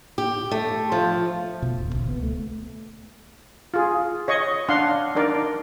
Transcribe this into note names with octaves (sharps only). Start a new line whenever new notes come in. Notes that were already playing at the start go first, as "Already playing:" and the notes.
G4
A3
F3
B2
D#1
C#2
B3
A3
F4 G#4
C#5 D#5 C#6
D4 F5 F#5 C6
D4 D#4 A#4 D5